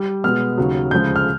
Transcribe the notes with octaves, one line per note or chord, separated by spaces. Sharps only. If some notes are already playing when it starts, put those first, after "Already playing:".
Already playing: G3
B2 G#3 B3 F6
D#2 C#3 F#3
D2 C#3 F3 G#3 G6
F6